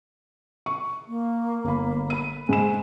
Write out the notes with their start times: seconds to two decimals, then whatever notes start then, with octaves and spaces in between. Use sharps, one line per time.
0.66 C#6
1.08 A#3
1.64 G1 B5
2.10 B5 D#7
2.49 G#2 G#5 B5 E7